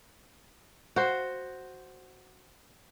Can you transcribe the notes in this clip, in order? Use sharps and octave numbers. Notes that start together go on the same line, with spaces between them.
F#4 C5